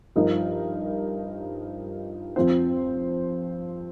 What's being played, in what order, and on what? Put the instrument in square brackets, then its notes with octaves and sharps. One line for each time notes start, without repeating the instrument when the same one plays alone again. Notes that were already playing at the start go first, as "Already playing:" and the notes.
[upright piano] G2 F3 D#4 A#4
F2 F3 C4 F4 C5